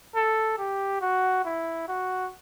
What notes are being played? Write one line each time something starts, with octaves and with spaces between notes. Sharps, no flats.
A4
G4
F#4
E4
F#4